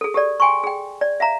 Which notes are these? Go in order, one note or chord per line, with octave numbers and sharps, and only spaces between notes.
G#4 A4
G4 A4 D5
G5 G#5 C6 C#6
G#4 G5
D5
E5 F5 A#5